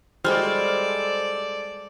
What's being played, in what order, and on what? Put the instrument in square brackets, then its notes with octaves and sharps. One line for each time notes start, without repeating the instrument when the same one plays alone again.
[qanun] G3 G#3 F#4 [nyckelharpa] A4 D5 [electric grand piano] C5 F6